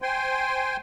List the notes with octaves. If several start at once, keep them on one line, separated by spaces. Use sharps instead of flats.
C5 G5 G#5 C6